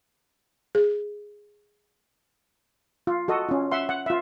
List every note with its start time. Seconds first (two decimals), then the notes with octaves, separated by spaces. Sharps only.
0.75 G#4
3.07 F4
3.28 F#4 A4 D#5
3.49 C#4 F4
3.71 E5 F#5 C6
3.89 F#5
4.06 F4 E5